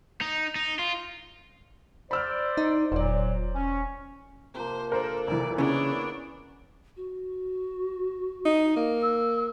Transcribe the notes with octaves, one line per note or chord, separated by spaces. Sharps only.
D#4
D#4
F4
C5 D5 B5 E6 F6
D#4
E1 A#2 F#3 C5 D5
C#4
C3 F3 A#3 C5
D4 A4 A#4 C5
F1 E3 D5
C#3 E3 A#3 B3 D4 E4 C#5
F#4
D#4
A#3
E6